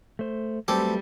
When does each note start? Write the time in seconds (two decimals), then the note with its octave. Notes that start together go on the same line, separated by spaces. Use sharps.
0.19 A3 C5
0.68 F#3 G3 A3 C4 A4 B4 D6